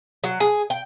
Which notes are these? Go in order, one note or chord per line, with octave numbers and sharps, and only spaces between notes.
F#3
G#4
G5